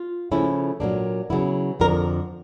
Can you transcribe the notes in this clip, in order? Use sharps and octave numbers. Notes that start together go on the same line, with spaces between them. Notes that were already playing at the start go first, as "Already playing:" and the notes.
Already playing: F4
C#3 F3 A3 C#4 E4
A#2 F#3 A#3 D4
C#3 F#3 B3 E4
F2 D3 F3 A#4